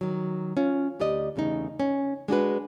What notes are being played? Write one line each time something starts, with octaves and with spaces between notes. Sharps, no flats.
D#3 F#3
C#4 F4
D2 G4 D5 D#5
E2 C#3 A3 D#4
C#4
G#3 D4 F#4 B4